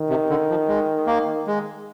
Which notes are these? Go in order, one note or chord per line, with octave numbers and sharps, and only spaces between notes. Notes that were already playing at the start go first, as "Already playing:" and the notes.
Already playing: D#3
C3
D3
F3
G#3
A#3
G#3